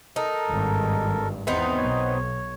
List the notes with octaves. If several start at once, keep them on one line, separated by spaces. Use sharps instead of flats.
D#4 A4 A#4
G#1 G2
E2 B3 C4 D#4
B1 C#5